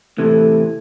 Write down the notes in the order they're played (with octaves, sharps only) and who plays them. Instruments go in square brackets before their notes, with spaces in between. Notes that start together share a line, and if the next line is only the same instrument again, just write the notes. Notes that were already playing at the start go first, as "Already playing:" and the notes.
[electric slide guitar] A2 C3 E3 [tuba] A3